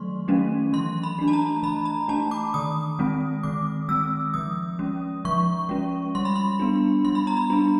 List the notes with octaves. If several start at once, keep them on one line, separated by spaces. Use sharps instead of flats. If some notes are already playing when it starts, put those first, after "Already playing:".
Already playing: D#3 F#3 A3 C6 C#6
F#3 A3 C#4
E3 C6
B5
A3 D4
A5
A#5
E3 B5
A#5
A3 D4 A5
D6
D#3 D#6
G#3 C4
D#3 D6
G#3 C4 E6
F3 D#6
G#3 C#4
F3 C#6
G#3 C#4
G3 C6
B5
C6
B3 D4
G3 C6
B5
A#5
B5
B3 D4